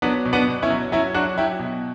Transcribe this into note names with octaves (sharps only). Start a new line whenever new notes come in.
F#3 B3 D4
B2
B3 D4
B2
C#4 E4
F#3
F#3 C#4 E4
F#3 D4 F#4
F#3 E4 G4
B2